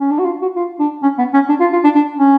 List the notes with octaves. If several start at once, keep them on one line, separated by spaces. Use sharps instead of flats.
C#4
D4
F#4
F4
F#4
F4
D4
C#4
B3
C#4
D4
F4
F4
D4
D4
C#4